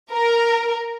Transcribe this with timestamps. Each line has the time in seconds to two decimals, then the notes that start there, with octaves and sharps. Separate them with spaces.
0.11 A#4